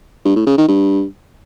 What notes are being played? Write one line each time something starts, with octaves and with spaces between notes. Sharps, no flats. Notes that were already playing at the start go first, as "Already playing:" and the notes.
G2
A2
C#3
D#3
G2